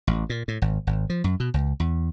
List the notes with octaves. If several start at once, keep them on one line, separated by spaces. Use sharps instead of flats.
A1
A#2
A2
G#1
G#1
F3
F#2
B2
C#2
E2